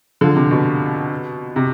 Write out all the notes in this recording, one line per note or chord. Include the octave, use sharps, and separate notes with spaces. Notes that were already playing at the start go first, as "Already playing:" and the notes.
D3 F3
C3
B2
C3